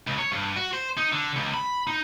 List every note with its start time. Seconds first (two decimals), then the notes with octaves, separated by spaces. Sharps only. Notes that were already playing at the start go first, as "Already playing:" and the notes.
0.07 C#2
0.19 C#5
0.32 G2
0.56 F#4
0.73 C5
0.97 D#4
1.12 D3
1.36 C#2
1.54 B5
1.87 D#4